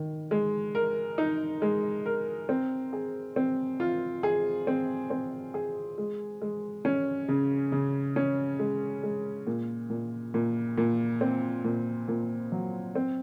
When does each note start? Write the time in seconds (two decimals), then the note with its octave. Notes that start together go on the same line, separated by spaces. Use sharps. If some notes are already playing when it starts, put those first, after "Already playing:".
Already playing: D#3
0.31 G#3
0.75 A#4
1.18 D#4
1.62 G#3
2.06 A#4
2.49 C4
2.93 G#4
3.36 C4
3.80 F4
4.23 G#4
4.67 C4
5.10 C4
5.54 G#4
5.98 G#3
6.42 G#3
6.85 C#4
7.28 C#3
7.72 C#3
8.16 C#4
8.59 G#3
9.03 G#3
9.47 A#2
9.90 A#2
10.34 A#2
10.78 A#2
11.21 C4
11.65 A#2
12.08 A#2
12.52 F#3
12.95 C4